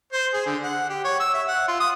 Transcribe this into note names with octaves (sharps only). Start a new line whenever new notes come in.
C5
G#4
D3
F#5
G4
C#5
E6
E5
F#5
F4
D#6